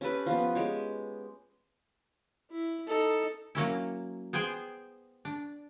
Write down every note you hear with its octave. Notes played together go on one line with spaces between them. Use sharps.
C#4 G4 A4 B4
F3 B3
G#3 G4 C#5
E4
D#4 A4
F#3 A#3 C#4 E4
B3 G#4 C5 G5 G#5
D4